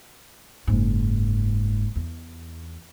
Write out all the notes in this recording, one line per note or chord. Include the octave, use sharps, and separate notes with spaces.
F#1 G#2
E2